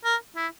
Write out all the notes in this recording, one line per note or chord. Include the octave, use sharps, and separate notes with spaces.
A#4
E4